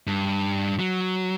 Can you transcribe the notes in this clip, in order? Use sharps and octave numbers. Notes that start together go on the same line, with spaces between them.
G2
F#3